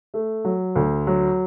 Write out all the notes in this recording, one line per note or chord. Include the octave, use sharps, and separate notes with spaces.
A3
F#3
D2
F#3